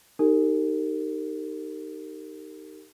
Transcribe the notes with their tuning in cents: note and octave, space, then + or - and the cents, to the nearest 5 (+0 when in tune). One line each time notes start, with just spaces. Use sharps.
D#4 +0 G4 +0 A#4 -35